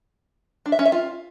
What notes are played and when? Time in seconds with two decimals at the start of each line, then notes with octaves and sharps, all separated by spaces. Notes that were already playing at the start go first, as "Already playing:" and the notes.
0.66 D4
0.72 E5
0.79 C#4
0.86 E5
0.92 F4